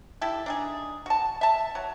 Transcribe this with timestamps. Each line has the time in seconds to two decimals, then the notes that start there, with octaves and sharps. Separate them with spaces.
0.21 E4 G4 A4
0.46 D4 D#4 G#4
1.06 F#4 A5
1.41 E5 A5
1.75 F#3